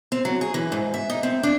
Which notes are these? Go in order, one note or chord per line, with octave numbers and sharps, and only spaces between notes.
C4
F#3
G#4
E3
G#2
E5
D#4
C4
D4